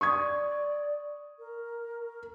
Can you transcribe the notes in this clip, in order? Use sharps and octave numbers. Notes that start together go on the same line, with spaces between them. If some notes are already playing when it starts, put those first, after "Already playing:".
D5 C#6 D#6 G#6
A#4